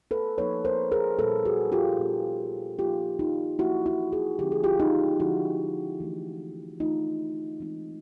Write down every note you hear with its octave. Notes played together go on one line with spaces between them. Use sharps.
A4 B4
F3 A#3 D#4 B4 C#5
A#4 C5
G#4 A#4
A#2 G3 B3 D#4 A4 B4
F#4 G#4
F4 G4
A#2 G3 B3 D#4
F3 A#3 D#4 F4 G4
D#4 F4
F3 A#3 D#4 E4 F#4
E4 F#4
F#4 G#4
D3 F3 G#3 C#4 G4
G#4
F4 G4
D#4 F4
D3 F3 G#3 C#4 E4 F#4
E3 A3 D4
E3 A3 D4 D#4 F4
E3 G#3 C4 D#4